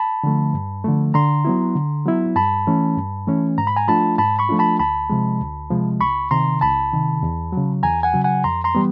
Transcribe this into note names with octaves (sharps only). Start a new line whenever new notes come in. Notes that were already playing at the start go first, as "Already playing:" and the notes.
Already playing: A5 B5
D3 F3 A3
G2
D3 F3 A3
D3 A#5 C6
F#3 B3 E4
D3
F#3 B3 E4
G2 A5 B5
E3 A3 C#4
G2
E3 A3 C#4
G#2 A#5
B5
G#5 A#5
F3 A3 D4 F4 A5 B5
G#2 A5 B5
B5 C#6
F3 A3 D4 F4
A5 B5
D2 A5 B5
C3 F3 G#3
D2
C3 F3 G#3
C#2 B5 C#6
C3 D#3 A#5 C6
C#2 A5 B5
C3 D#3
E2
C#3 F#3
E2 G#5 A#5
F#5 G#5
C#3 F#3
F#5 G#5
F2 A#5 C6
A#5 C6
E3 G3 B3